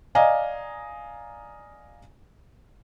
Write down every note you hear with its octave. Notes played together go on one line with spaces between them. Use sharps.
D5 D#5 F5 G#5 A#5